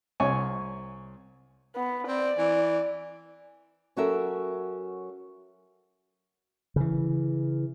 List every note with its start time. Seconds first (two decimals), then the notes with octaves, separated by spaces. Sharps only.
0.20 C2 C#5 G#5
1.76 B3
2.08 C4 D5
2.38 E3
3.97 F#3 C#4 F#4 A4 A#4 E5
6.76 C#3 E3